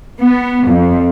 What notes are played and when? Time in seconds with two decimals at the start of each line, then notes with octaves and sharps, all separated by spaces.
0.20 B3
0.69 F2